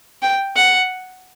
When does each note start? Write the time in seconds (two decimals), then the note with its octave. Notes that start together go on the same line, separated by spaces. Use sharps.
0.22 G5
0.56 F#5